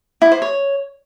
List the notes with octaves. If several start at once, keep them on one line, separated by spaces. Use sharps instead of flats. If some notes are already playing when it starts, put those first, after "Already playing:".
E4
C5
C#5